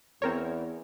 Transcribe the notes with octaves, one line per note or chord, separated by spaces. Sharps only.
E2 C4 A#4 C#5